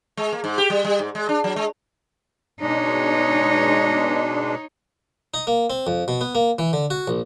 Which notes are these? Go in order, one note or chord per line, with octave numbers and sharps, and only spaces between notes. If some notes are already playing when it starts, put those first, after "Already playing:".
G#3
A#3
G#2
G4
G3
G3
G#2
G#3
D4
F#3
G#3
B2 G#3 D4 D#4 C#5
D#4
A#3
C4
F2
B2
B3
A#3
E3
D3
F#4
A#1